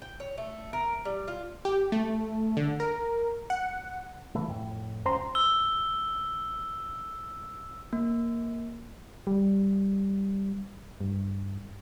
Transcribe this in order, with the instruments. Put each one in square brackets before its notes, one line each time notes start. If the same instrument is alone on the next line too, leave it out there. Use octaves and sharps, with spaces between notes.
[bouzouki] G5
C#5
A3
A#4
G3
F4
[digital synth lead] G4
A3
D3
A#4
F#5
[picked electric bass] C#3 E3 A3
F2 A2
[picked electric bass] F#1 C#2 C#4 [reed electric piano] C5 A#5 C6
[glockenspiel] E6 G7
[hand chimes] A#3
[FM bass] G3
G2